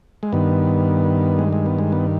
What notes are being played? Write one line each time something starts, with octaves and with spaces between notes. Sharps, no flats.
G#3
G2 D#3 B3
G#3
G#3
B3
G#3
B3